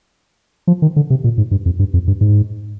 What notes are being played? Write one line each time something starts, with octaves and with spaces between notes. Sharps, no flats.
F3
D#3
D3
C3
A#2
G#2
G2
F2
G2
F2
G2
G#2